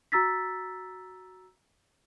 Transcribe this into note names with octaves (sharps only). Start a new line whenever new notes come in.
F#4 A#5 E6 A6 B6